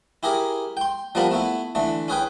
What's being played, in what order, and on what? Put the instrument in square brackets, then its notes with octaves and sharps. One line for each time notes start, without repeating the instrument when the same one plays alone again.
[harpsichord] E4 G4 G#4 A#4
G5 C6
F3 G3 B3 A#4 A5 B5
A3 B3 E4
D3 E3 A3
C#4 G#4 B4 G5